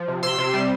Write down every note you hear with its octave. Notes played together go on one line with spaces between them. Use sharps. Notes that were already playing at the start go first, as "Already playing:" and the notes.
Already playing: F3
C3
C3 C6 E6
C3
G3